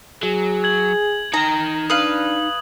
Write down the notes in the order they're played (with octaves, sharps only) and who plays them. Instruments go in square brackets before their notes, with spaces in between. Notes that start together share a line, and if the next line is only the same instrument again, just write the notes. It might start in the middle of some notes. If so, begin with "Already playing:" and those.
[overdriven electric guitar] F#3 [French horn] G#4
[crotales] G#6 F#7
[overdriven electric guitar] D#4 G5 [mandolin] A#5
[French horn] D4 [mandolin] B4 F5 [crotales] D#6 F#7